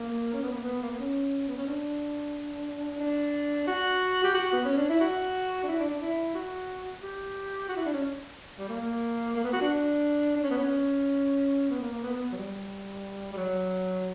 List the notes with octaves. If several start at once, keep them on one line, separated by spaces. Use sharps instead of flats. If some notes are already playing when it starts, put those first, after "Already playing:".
Already playing: A#3
C#4
B3
A#3
B3
A#3
B3
C#4
B3
C#4
D4
D4
F#4
G4
F#4
B3
C#4
D4
E4
F#4
D4
E4
D4
D4
E4
F#4
G4
F#4
E4
D4
C#4
G3
A#3
A#3
B3
F#4
D4
D4
C#4
B3
C#4
B3
A#3
A#3
B3
B3
F#3
G3
G3
F#3